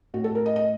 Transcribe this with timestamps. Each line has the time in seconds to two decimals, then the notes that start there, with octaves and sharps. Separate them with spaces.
0.14 A2 F#4
0.24 A4
0.35 A#4
0.46 D#5
0.56 D#5